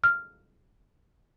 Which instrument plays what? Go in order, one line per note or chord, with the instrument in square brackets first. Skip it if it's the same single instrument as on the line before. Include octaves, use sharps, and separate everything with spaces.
[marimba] F6